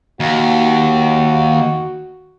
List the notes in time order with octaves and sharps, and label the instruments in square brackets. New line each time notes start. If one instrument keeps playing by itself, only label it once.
[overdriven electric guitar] D#2 [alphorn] F#4